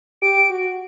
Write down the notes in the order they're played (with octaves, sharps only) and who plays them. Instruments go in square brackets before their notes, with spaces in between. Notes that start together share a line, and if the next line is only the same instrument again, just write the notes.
[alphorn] G4 [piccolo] D7
[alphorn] F#4